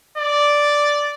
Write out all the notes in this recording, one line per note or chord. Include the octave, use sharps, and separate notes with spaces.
D5